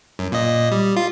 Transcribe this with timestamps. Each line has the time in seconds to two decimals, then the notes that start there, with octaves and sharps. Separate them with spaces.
0.19 F#2
0.32 A#2 D#5
0.72 G3
0.97 F4